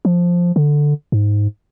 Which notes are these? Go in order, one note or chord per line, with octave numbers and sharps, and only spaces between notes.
F3
D3
G#2